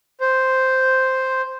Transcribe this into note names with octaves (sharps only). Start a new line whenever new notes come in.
C5